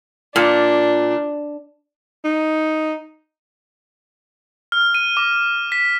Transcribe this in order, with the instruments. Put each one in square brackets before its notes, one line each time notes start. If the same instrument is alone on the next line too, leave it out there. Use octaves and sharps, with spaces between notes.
[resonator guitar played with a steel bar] A#2 [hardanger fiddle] D4
[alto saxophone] D#4
[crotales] F6
D#7
D6
B6